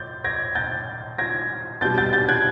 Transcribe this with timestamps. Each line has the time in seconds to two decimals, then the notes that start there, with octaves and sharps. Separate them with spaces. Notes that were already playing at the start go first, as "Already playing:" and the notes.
Already playing: G6 A6
0.24 G#6 A#6
0.55 G6 A6
1.18 G#6 A#6
1.81 B2 G6 A6
1.85 G3
1.98 G6 A6
2.13 G6 A6
2.29 F#6 G#6